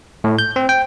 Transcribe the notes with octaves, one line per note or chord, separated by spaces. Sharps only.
A2
G6
C4
G5